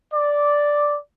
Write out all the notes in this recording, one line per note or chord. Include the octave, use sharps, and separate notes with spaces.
D5